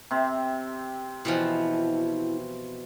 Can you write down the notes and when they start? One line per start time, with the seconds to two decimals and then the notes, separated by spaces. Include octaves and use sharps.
0.11 C3 C4
1.25 B2 E3 F3 E4